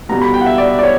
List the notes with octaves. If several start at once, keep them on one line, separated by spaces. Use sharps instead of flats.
B2 G3 B3 A#5
B5
G5
F#5
E5
D5
D5
C#5